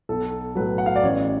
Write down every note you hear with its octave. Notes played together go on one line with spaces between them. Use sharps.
B1 A4
A2 F#3 B4
F#5
F5
D5
A1 C#5